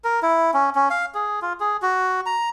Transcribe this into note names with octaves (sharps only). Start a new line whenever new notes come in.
A#4
E4
C#4
C#4
F5
G#4
F4
G#4
F#4
A#5